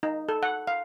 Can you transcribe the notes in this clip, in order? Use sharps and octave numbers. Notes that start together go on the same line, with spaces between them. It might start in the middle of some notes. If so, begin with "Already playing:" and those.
D#4
A4
F#5
F5